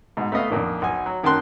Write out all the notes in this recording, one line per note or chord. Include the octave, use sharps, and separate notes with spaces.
G#2 B2
A3 B3 D#5 F5
F2 A#2 D3 D#3
B1 G#5
F#3
F#2 D#3 A#3 A5 C6 F#6